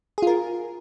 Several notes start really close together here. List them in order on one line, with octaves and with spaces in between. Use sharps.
G#4 F4 A#4